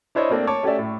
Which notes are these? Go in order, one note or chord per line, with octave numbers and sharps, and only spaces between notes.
D4 E4 C5 C#5 D#5
A3 A#3 C4 D4
C#5 A5 C#6 D6
A3 C#4 G4 C#5 D5 E5
A2